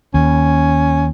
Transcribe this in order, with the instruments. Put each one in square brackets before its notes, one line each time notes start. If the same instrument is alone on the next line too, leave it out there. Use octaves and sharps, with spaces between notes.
[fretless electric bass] D#2 [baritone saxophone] C#4